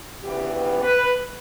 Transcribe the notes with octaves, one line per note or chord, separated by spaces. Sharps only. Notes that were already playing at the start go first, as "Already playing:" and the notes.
D2 C#3 E3 B3 G4
G4
B4